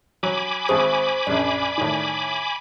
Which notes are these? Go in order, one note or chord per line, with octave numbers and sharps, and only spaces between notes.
F#3 G#5 B5 D6
G#1 G#4 C5 C#6
A#1 F#2 D5
A2 D#3